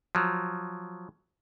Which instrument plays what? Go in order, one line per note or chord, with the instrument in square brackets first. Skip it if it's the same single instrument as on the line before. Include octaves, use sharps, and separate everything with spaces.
[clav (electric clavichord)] F3 F#3